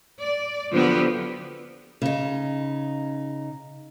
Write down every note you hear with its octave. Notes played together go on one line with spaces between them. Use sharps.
D5
D3 F3 F#3 B3 G4
C#3 D#4